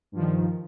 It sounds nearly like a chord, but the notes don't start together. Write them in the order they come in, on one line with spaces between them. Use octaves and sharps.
G2 F3 D#3